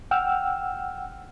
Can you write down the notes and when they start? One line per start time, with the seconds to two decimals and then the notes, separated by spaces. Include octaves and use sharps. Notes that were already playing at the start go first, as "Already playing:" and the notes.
0.11 F#5 G5 E6 F6